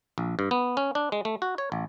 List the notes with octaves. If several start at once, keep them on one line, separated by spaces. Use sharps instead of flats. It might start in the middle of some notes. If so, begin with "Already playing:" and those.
A#1
G2
B3
C#4
D4
G#3
A3
F#4
C#5
A1